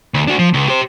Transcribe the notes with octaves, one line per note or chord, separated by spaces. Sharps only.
D2
D4 F#4
F3
C#2
G4 C5